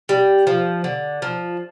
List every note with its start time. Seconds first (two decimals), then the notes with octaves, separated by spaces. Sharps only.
0.09 G3
0.47 F3
0.84 D3
1.22 F3